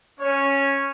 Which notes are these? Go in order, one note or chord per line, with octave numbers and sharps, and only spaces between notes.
C#4 C#5